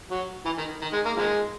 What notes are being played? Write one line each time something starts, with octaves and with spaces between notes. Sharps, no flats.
F#3
E3
D#3
D#3
G#3
A#3
D#3 F3 G#3